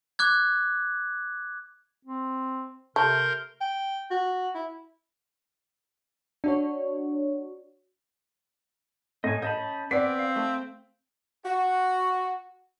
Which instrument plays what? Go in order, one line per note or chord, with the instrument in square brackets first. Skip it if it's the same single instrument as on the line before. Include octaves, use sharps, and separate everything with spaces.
[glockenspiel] D6 F#6 G#6
[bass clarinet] C4
[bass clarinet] C3 [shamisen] A3 [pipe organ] A#4 C6 G6
[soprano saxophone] G5
F#4
E4
[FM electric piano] D4 F#4 C#5
[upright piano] A2 [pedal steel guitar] D#5 G#5
[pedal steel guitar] C#4 A5 B5 [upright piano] D#5 G6
[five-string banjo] B3 D5 [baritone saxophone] C4 [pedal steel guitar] D6 [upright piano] B6
[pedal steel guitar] F5
[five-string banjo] A3
[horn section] F#4